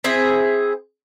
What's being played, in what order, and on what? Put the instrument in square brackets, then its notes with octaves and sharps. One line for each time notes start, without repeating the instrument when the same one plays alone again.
[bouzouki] C4 E4 G#4 E5